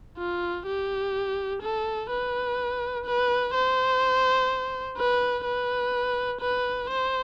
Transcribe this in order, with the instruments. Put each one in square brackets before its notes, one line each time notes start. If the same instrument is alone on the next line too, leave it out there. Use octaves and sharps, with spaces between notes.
[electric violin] F4
G4
A4
B4
B4
C5
B4
B4
B4
C5